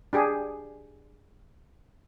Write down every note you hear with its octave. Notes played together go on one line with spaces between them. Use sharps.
D4 G4 G#4